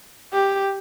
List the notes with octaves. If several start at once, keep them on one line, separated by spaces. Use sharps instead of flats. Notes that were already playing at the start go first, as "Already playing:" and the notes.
G4